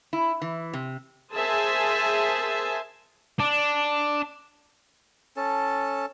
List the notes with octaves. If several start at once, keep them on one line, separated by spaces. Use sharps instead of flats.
E4
E3
C3
G#4 A#4 C5 E5 G#5 A5
D4
C#4 A4 A5